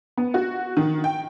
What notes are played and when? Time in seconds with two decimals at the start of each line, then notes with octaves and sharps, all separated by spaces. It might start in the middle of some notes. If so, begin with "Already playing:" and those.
0.17 B3
0.34 F#4
0.77 D#3
1.04 G5